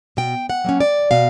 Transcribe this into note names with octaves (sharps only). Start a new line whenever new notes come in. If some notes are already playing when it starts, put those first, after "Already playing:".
B2 G5
F#5
F#3 A#3 C#4
D5
B2 F5